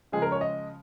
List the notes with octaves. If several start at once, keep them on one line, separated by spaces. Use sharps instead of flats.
C#3 F3 G#3 G#4
A#4
C#5
D#5